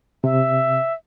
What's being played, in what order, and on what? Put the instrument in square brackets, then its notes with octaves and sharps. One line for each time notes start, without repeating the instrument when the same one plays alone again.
[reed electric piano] C3 [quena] E5